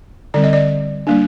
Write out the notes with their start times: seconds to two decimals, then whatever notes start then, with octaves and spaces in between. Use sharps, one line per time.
0.34 D3 G3 C4 D5
0.44 D#5
0.53 D5
1.07 G3 A#3 D4